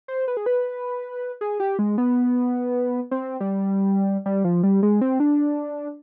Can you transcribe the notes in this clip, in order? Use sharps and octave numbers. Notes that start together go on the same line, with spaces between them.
C5
B4
G#4
B4
G#4
G4
G#3
B3
C4
G3
G3
F3
G3
G#3
C4
D4